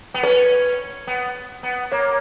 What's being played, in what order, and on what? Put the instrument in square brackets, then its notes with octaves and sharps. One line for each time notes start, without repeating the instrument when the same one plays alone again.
[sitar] B3
[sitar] C#4 [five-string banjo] B4
[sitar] B3
B3
[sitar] A#3 [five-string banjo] C#5